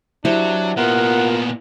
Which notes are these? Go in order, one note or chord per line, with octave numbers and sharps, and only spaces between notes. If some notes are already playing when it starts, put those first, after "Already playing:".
F#3 D4 E4 G4 C5
A#2 B3 F4 A#4 F#5